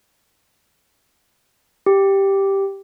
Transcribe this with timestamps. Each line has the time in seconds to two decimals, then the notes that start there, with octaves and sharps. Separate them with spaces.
1.86 G4